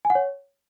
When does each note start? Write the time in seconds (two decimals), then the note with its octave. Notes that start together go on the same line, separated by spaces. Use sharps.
0.05 G#5
0.10 F#5
0.15 C#5